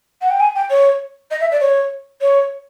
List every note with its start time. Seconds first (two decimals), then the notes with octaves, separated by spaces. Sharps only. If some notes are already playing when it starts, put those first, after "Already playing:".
0.21 F#5
0.30 G5
0.39 G#5
0.55 G5
0.70 C#5
1.30 D#5
1.40 E5
1.51 D5
1.60 C#5
2.21 C#5